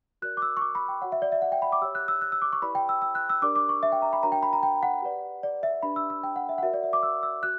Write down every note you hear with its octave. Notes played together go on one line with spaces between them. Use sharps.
F#4 A#4 D5 F#6
D6
E6
C#6
D6
B5
G5
F#4 C#5 F#5
E5
D5
E5
F#5
G5
B5
D6
G4 C#5 E6
F#6
E6
F#6
E6
D6
C#6
E4 G4 B4 D5 B5
G5
E6
E6
F#6
E6
D4 G4 A#4 D5 D6
D6
C#6
E5
G5
A#5
B5
D4 F#4 A#4 C#5 A#5
G5
B5
A#5
G5
F#5
G4 B4 D5
D5
E5
D4 G4 B4 D5 B5
E6
E6
G5
F#5
E5
F#5
F#4 A#4 C#5 E5
D5
E5
D6
E6
E6
F#4 F#6